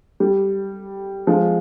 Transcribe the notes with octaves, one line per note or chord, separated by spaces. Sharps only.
G3
F3 G#3